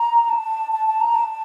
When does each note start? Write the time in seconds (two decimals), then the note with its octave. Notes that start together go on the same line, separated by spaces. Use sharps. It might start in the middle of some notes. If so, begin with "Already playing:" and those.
Already playing: A#5
0.29 A5
0.72 A5
0.87 A5
1.01 A#5
1.15 A5